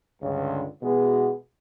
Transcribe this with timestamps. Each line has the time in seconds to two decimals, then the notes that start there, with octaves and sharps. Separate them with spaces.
0.22 C#2 G2 D3
0.82 B2 E3 G#3 B3 F#4 G#4